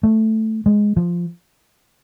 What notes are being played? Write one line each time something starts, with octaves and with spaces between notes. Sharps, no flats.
A3
G#3
F3